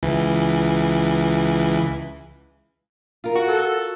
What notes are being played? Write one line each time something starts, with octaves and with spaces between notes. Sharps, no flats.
C#2 E3
F4 A#4
F#4
A4